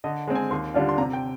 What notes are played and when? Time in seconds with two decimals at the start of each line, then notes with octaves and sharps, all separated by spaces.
0.04 D3 D#5
0.27 G#3 C4
0.35 G#5
0.50 D#2 C6
0.74 D3 G3 D4 F4
0.89 C6
0.98 C3 A#5
1.13 G5